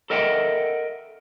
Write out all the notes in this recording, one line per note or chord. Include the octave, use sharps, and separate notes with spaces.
A4 A#4 D#5 E5 F#5 G5